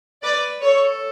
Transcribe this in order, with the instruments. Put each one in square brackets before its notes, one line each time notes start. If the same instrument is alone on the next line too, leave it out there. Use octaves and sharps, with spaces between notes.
[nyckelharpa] B4 [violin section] D5
[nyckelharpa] A4 [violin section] C#5